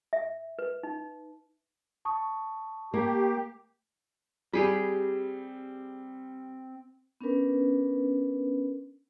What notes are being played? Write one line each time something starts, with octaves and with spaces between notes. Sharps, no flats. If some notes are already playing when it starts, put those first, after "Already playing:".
E5
B4
D#4
A5 C#6 D#6
A#3 G4
G3 C4 G4 G#4 B5
B3 C#4 D4 A#4 B4